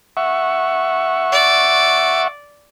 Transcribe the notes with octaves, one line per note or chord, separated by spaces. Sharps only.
E5 F#5 C#6
D5